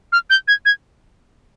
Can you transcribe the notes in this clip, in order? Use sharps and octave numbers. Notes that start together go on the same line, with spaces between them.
F6
G6
G#6
G#6